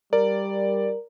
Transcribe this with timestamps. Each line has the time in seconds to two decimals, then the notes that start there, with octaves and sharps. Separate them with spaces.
0.13 G3 A#4 D5